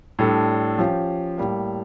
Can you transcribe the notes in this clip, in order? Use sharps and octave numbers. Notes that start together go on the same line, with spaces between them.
A2 G3 D4 A4
F3 C#4 G4
A2 G3 A#3